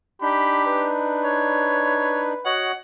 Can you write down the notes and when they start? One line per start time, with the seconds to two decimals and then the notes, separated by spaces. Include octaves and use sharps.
0.22 D4 D#4 G4 B5
0.66 B4
1.24 C#5
2.45 F#4 C#5 D#5 F#5